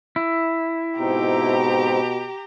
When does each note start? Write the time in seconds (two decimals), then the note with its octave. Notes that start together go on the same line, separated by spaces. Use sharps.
0.16 E4
0.99 G#2 B2 C4 D#4 G4 A#5